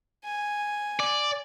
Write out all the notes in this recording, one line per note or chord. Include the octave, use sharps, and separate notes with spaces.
G#5
D5